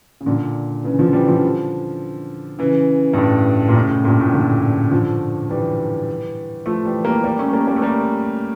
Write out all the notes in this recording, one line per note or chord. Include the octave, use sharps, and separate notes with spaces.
C#3
A#2 D3
C#3 E3
D3 F3
E3 G3
D3 F3
C#3 E3
G2
A2
A#2
A2 C#3
A2
G2 A#2
A2 C#3
A#2 D3
D3 F3
E3 G3
F3 A3
E3 G3
G3 A#3
G3 A#3
A3 C#4
G3 A#3
G3 A#3
A3
G3 A#3